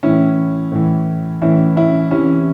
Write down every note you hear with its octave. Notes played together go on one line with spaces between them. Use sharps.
A2 E3 C#4 E4
A2 E3
A2 E3 C#4 E4
C#4 E4
C3 E3 C#4 E4